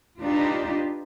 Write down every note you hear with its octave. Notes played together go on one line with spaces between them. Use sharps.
D4 D#4 F4 G4 B4